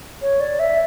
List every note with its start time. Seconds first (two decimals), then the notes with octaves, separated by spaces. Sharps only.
0.22 C#5
0.40 D5
0.59 E5